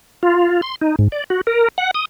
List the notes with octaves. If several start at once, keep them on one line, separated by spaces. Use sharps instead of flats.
F4
C6
D#4
G#2
D5
F#4
A#4
F#5
D#6